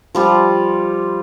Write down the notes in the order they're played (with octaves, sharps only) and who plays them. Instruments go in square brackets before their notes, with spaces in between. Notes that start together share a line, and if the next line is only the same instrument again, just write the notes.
[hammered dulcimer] F3 G3 F4